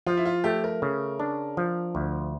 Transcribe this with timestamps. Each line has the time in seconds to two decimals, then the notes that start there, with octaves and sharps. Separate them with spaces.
0.06 F3 F4
0.17 E4
0.25 F4
0.44 A3 G4
0.64 A#4
0.82 C#3
1.20 D4
1.57 F3
1.95 D2